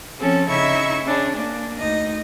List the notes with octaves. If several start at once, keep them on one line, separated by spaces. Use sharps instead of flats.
F3 C4 C#4 A4
C#3 D#4 E4 E5 C#6 G#6
C#4 D4 G#4
A#3 D4
D2 D#4 D#5